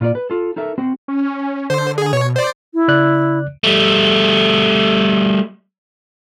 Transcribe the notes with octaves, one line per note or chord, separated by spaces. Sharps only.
A#2 F4 C5 D5
B4
F4 A4
D#4 A4 A#4 E5
C4 F#4 C5
C#4
D3 C5
G#4
B2 C#5
C5 D5
E4
C#3 D5 F#6
G3 A3